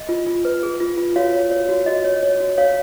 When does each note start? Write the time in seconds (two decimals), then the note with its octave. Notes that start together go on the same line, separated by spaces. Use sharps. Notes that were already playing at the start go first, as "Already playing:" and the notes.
Already playing: D#5
0.09 F4
0.27 F4
0.45 B4
0.63 G#4
0.80 F4
0.97 F4
1.16 F#4 C#5 F5
1.33 C#5
1.51 C#5
1.69 F#4
1.86 F#4 D#5
2.04 C#5
2.23 C#5
2.40 F#4
2.58 C#5 F5